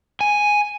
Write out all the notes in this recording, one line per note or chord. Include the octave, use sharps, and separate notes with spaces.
G#5